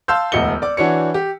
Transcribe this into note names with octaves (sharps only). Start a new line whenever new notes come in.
F5 A5 C6 E6 F6 G6
E1 D2 D#5 C#7 G7
D5 D6
E3 D4 F#4 C#5 C#7
G4